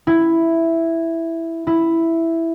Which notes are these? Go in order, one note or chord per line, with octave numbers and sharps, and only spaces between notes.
E4
E4